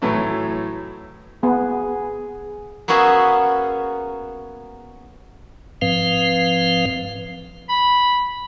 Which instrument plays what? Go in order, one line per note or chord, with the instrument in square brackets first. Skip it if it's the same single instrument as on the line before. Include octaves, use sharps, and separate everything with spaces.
[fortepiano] A2 E3 F#3 A3
[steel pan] B3 [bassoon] G#4
[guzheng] A#3 B3 C#4 F#4 G#4 E5
[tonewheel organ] G#2 F3 C4 B4 F5
[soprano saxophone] B5